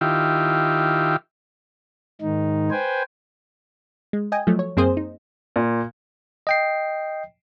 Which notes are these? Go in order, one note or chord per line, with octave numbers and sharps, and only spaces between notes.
D#3 E4 F4 G4
G#2 D#3 D#4
B4 C5 G5 G#5
G#3
D#5 G5 G#5
F3 F#3 A3
C#5
F#2 A#3 C4 G#4 C5 D#6
D#4
A#2
D#5 G5 C7